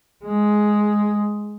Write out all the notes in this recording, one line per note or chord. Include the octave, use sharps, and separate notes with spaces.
G#3